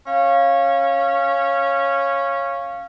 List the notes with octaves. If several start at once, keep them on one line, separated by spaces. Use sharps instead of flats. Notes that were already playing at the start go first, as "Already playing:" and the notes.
C#4 F5